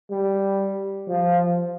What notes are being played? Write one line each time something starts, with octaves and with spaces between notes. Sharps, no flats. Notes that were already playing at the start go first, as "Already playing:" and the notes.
G3
F3